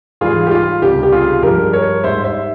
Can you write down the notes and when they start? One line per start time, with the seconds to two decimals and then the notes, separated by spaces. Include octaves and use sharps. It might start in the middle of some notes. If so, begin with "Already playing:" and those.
0.21 G#2 E3 G3 F4 G#4
0.46 G4
0.51 F4
0.82 C#2 C3 G3 G4
1.03 G4
1.12 F4 G#4
1.42 G2 F3 G#3 G4 A#4
1.73 A#4 C#5
2.03 G#2 G3 C5 E5
2.24 C5 E5